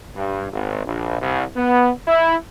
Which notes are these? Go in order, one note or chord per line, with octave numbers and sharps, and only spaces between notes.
G2
G#1
A#1
C2
B3
E4